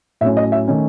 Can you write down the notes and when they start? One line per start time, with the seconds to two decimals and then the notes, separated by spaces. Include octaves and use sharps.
0.21 A2 F#3 A3 C#4 E5
0.37 D#5
0.52 E5
0.68 D#3 A3 C#4